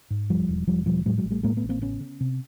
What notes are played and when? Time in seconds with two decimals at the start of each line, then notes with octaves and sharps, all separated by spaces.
0.10 G#2
0.30 E1 F3 G3
0.49 E1
0.67 E1 F3 G3
0.86 B2 F3 G3
1.05 A2 F#3 G#3
1.18 F#3 G#3
1.24 A1
1.31 G3 A3
1.43 A2 G#3 A#3
1.57 A3 B3
1.63 A1
1.69 A#3 C4
1.82 C#3 B3 C#4
2.00 C#3
2.21 C3